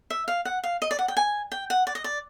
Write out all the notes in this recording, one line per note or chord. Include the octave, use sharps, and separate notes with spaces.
E5
F5
F#5
F5
D#5
D5
F#5
G5
G#5
G5
F#5
D5
D#5
D5